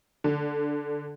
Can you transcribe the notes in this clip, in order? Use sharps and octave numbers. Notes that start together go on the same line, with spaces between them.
D3